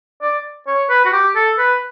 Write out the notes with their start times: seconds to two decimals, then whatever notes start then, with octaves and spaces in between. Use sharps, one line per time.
0.22 D5
0.67 C#5
0.90 B4
1.05 F#4
1.13 G4
1.36 A4
1.59 B4